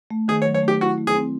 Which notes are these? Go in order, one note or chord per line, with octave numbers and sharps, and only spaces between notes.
A3
D#3 G#4
C#5
F#3
C#5
A3
G4
E4 F#4
A3
G#4
C4